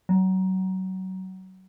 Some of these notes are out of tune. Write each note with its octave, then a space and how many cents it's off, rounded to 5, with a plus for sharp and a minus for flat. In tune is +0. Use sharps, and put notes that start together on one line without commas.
F#3 +25